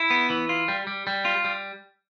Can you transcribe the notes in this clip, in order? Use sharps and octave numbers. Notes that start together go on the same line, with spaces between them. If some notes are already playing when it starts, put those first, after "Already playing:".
Already playing: E4
B3
E3
F4
G3
G3
G3
F4
G3